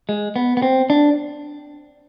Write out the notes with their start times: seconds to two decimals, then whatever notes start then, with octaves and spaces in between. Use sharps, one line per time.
0.09 G#3
0.36 B3
0.57 B3
0.62 C4
0.90 D4